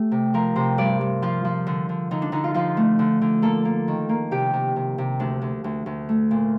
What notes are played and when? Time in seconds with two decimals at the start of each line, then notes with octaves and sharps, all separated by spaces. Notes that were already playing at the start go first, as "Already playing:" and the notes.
Already playing: A3 G4
0.12 C3
0.34 F3 A#4
0.56 C3 C5
0.78 G2 D5
1.01 G2
1.22 F3 F4
1.45 F3
1.67 D3
1.89 D3
2.11 D3 D#4
2.22 D4
2.32 D3 D#4
2.44 F4
2.54 F3 F4
2.77 A3
2.99 D3
3.21 D3
3.42 A#3 A4
3.65 A#3
3.88 D#3
4.09 A#3
4.31 C3 G4
4.53 C3
4.76 C3
4.98 C3
5.20 D2 D4
5.42 D2
5.64 D2
5.86 D2
6.09 A3
6.31 A#2